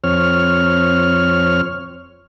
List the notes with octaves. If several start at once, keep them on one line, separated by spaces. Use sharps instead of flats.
F2 C4 C#5 F6